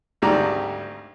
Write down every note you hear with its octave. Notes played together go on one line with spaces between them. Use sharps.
G#1 D2 G#2 G3 D5 A#5